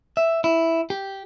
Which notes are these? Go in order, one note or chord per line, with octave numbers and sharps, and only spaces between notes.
E5
E4
G4